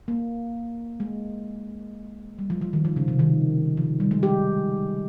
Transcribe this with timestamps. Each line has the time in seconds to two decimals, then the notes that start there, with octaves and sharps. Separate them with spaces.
0.08 A#3
1.00 G#3
2.39 G3
2.50 F3
2.62 F3
2.73 D#3
2.85 F3
2.96 C#3
3.08 C3
3.19 D#3
3.77 F3
4.00 G3
4.11 G#3
4.23 G4